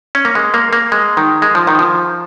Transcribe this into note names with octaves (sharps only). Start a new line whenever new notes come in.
C#4
A#3
G#3
A#3
A#3
G#3
D#3
G#3
F3
D#3
F3